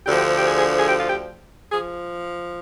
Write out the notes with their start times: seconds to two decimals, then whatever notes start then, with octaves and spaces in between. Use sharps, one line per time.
0.06 D2 D3 F3 G4
0.18 G4
0.38 G4
0.48 G#4
0.59 G#4
0.79 G#4
0.89 G4
1.00 F4
1.10 G4
1.72 F3 G#4